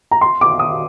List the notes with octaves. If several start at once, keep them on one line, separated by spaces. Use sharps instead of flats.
A#5
C6
D6
D#6